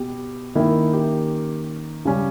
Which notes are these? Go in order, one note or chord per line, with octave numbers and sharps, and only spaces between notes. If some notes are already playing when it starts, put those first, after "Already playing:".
Already playing: B2 G4
D#3 A#3 C#4 E4
G4
C#3 G3 C#4